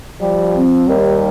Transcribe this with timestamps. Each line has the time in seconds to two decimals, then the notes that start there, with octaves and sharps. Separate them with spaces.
0.20 F3 G3
0.54 C4
0.88 D#2 G3